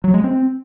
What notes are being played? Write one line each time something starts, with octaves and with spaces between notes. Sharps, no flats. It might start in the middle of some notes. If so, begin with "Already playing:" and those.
F#3
G#3
C4